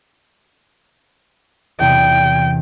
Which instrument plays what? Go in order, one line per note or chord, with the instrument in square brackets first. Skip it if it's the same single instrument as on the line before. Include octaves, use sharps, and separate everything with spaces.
[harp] E2 C3 B3 [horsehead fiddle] G5